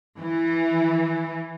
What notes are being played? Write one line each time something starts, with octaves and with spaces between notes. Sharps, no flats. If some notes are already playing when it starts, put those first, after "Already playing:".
E3